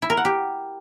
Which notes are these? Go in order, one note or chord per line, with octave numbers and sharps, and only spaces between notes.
E4
A#4
F#5
G4